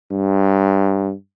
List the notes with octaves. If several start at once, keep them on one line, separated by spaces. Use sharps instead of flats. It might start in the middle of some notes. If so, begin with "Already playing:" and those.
G2